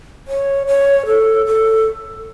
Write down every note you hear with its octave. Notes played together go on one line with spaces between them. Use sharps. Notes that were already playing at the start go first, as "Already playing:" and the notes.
C#5
C#5
A4
A4